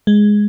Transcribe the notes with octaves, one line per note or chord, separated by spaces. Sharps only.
G#3